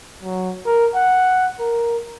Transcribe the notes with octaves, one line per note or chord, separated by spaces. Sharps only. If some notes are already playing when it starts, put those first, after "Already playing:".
F#3
A#4
F#5
A#4